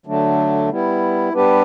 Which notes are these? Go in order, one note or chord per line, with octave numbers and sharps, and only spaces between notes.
D3 F#3 A3 D4
G3 B3 E4
G3 B3 D4 G4 B4